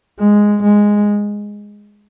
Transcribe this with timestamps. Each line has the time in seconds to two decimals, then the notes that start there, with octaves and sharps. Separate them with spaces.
0.20 G#3
0.64 G#3